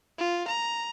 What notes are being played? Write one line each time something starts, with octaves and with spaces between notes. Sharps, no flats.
F4
A#5